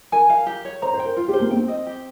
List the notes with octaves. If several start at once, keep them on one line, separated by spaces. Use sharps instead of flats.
A#4 G#5
F5
G4
C#5
C5 A#5
C5
G5
A#4
F4
G4
C5
A#3
C4 G5
D#5
G4